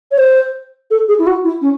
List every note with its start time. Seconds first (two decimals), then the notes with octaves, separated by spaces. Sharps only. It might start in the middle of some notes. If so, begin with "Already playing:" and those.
0.11 C#5
0.17 C5
0.90 A4
1.08 G#4
1.18 E4
1.26 F#4
1.44 E4
1.61 C#4